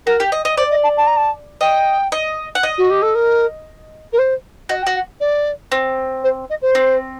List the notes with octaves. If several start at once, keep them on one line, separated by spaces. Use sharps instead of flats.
F#4 A#4
G4
D#5
D#5
C5 D5
D#5
A5
A5
A#5
A5
D#5 G5
D#5
F#5
D#5
F#4
G4
A4
A#4
A#4
C5
F#4 D#5
G5
F#4
F#5
D5
C4
C5
D#5
C5
C4